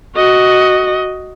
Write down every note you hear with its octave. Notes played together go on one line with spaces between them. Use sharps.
F#4 D#5